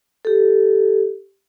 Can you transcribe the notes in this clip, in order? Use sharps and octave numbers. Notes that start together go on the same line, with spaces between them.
G4 A4